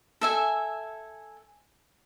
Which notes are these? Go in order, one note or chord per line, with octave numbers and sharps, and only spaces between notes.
A4 E5 G#5